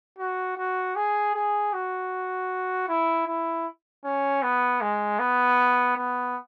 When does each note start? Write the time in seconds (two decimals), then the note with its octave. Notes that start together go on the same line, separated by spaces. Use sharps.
0.19 F#4
0.57 F#4
0.96 G#4
1.34 G#4
1.73 F#4
2.89 E4
3.27 E4
4.04 C#4
4.43 B3
4.81 G#3
5.19 B3
5.97 B3